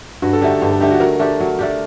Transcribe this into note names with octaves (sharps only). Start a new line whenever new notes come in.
G2 F#4
A4
D3 A3 D#4 G4
G2 G4
A4
D3 A3 D#4 G4
F#4
F#3 A#4
A3 D4 G4
F#3
A3 D4 G4